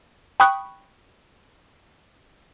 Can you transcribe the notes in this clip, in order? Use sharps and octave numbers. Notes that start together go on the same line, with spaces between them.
G5 B5 C#6 D#6 F#6